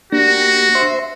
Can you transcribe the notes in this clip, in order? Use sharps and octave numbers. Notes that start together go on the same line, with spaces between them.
A#3 D4 F#4 G4 A#6
C5 E5 C6